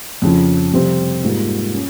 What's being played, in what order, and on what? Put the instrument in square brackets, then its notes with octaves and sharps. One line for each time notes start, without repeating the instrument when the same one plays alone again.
[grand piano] F2 C#3 F3
F2 C3 G3 C4
G#2 G3 A#3 F4
C#4